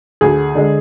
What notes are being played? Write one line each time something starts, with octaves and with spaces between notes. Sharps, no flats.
D2 G#4
D3 G#3